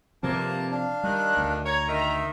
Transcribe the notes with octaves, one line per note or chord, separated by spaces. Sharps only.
G2 C3 F3 A3 A#3 C4 A5
D4 F5
D#3 G3 F#6
D2
C#5 A#5
D#3 E5